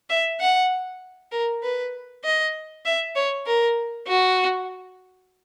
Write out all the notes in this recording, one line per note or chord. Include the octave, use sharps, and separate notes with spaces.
E5
F#5
A#4
B4
D#5
E5
C#5
A#4
F#4